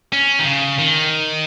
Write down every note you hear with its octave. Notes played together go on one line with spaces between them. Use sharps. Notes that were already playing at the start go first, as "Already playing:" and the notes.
C#4
D#3
C#3
D#3